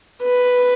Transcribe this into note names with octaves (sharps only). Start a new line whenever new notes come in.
B4